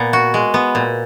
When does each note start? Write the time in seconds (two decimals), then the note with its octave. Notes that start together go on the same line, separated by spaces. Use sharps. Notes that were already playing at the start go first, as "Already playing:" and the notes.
Already playing: A#2 B3
0.13 F#4
0.34 G#3
0.54 B3
0.75 A#2